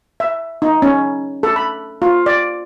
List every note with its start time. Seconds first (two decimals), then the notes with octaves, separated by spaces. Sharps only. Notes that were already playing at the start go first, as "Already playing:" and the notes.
0.20 E5
0.62 D#4
0.82 C#4
1.43 A4
1.56 B5
2.02 F4
2.26 D5